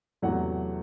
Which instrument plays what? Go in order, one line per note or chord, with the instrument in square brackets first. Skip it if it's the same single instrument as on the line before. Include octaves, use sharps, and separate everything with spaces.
[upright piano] E2 C3 F#3 A3 F#5